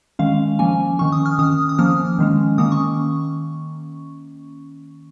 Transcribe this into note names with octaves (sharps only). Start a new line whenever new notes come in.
D#3 G#3 C#4 F5
F3 A#3 C#4 G#5
D#3 C#4 C#6
D#6
F6
D#3 C#4 D#6
D#6
F3 A#3 C#4 F6
D#3 G#3 C#4
D#3 A#3 C#4 D#6
C#6